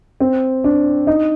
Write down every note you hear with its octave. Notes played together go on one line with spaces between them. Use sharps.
C4
D4
D#4